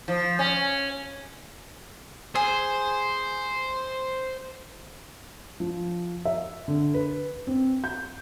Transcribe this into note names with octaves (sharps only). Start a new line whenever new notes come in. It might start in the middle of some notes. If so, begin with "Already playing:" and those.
F3
C#4
G#4 C5
F3
E5
D3
B4
C4
G6